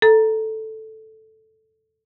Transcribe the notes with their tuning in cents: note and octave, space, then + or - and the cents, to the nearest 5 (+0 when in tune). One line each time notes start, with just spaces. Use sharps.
A4 +0 A#5 +5